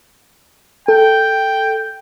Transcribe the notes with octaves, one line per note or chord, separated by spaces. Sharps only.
A4 G5